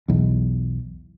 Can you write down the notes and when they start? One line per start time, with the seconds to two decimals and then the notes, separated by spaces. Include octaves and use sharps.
0.08 B1 E2